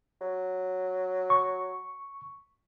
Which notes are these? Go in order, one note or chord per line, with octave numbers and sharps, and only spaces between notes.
F#3
C#6